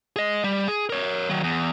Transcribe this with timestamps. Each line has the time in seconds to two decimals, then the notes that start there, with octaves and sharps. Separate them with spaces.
0.16 G#4 D#5
0.44 G3
0.68 G#4
0.90 A#4 C#5
1.30 D#3 F#3
1.43 E2